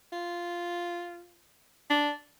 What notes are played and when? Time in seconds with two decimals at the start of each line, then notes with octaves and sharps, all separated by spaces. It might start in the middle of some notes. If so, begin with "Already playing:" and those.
0.12 F4
1.90 D4